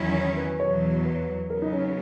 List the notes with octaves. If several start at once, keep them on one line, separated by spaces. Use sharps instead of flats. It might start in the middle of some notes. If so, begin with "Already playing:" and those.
Already playing: E2 D#3 F#3 C#4 E4
C#5
B4
E2 B2 F#3 C#5
B4
C#3 F#3 B3 A#4
D#4
C#4
C#4